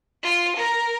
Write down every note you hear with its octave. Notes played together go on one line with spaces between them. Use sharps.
F4
A#4